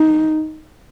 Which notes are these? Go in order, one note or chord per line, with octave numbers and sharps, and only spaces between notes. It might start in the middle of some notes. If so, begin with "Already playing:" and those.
Already playing: D#4